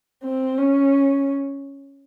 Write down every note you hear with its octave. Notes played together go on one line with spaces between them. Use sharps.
C4
C#4